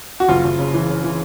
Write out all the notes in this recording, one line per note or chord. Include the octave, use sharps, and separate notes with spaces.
F#4
F#1 F4
F#1
C#3
E3
C#3
E3